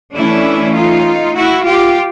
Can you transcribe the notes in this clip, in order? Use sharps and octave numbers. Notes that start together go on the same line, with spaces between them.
E3 A3 C#4 D4 E4
D#4 F4
E4 F#4
F4 G4